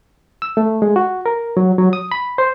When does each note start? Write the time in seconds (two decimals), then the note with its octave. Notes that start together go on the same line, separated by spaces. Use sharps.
0.42 E6
0.57 A3
0.82 G#3
0.96 F#4
1.26 A#4
1.57 F#3
1.78 F#3
1.93 D#6
2.12 B5
2.38 C5